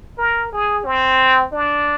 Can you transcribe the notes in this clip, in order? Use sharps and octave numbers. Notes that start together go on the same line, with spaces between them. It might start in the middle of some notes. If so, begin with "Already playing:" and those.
A#4
G#4
C4
D4